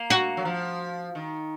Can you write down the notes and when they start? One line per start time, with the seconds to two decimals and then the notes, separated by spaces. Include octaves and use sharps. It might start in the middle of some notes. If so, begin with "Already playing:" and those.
Already playing: A#3
0.10 F#4
0.37 F#3
0.45 F3
1.15 D#3